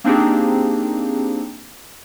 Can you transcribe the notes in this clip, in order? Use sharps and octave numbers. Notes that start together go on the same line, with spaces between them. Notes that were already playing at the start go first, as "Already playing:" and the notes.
A#3 C4 D4 D#4 G4 G#4